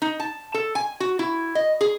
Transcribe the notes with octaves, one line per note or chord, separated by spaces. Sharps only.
D#4
A5
A4
G#5
F#4
E4
D#5
G#4